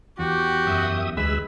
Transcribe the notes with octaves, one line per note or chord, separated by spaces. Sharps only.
E2 F#4 G4
F#2 E5 D#6
D2 G#3 B4 E6